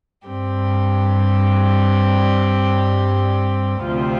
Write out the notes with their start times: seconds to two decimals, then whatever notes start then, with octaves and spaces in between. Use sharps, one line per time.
0.25 G2 G3 C4 G4
3.82 D2 C3 F3 C4 F4